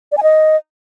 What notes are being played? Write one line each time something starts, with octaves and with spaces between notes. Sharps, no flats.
D5
G#5
D#5